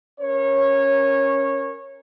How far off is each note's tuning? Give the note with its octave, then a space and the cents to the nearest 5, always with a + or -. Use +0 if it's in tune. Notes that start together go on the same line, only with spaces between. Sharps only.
C#4 +0 A#4 +0 C#5 -20